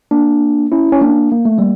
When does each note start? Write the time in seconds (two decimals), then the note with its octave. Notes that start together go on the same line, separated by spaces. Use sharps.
0.11 A#3 D4
0.72 C#4 E4
0.92 C#4
1.01 A#3 D4
1.32 A#3
1.45 A3
1.58 G3 A#3